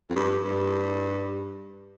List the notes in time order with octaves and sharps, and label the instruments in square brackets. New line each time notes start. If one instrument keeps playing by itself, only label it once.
[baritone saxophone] F2
G2
G2